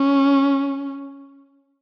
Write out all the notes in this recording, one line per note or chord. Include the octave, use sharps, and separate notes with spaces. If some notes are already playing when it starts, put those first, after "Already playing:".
Already playing: C#4